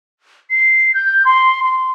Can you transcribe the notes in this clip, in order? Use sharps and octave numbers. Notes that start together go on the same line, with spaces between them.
C7
G6
C6
C6